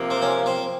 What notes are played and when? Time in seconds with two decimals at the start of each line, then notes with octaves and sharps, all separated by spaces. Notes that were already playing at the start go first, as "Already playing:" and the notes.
Already playing: C3 F3 A#3
0.10 C4
0.22 C#4
0.46 C4